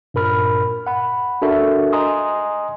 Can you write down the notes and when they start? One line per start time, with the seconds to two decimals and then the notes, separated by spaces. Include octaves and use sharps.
0.14 G2 A#2 A#4 B5 F6
0.87 F#5 B5
1.42 D4 F#4 A4 A#4 E5
1.93 D#5 G#5 A#5 C6 D#6